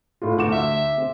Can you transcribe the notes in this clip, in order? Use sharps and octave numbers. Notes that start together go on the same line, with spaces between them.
A2 F4
D2 F#4 D6 E7
E5
C4